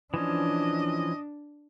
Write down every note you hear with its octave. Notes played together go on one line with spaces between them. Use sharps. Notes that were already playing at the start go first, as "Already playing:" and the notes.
E3 F3 C#4 D4 D#5